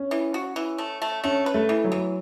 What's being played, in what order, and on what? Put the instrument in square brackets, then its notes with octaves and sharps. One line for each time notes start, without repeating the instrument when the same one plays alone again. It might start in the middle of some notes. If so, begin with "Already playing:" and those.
Already playing: [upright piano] C#4
[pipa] E3
F#4
E3
A3
A3
[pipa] A3 [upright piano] C#4
[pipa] B4
[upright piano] A3
[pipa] E3
[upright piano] F#3
[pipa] E3